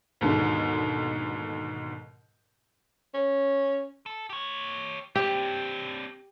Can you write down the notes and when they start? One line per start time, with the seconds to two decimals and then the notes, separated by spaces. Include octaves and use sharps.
0.21 D#2 G#2 B2 D3
3.14 C#4
4.06 A4
4.30 G4 C#5
5.16 C4 D4 G4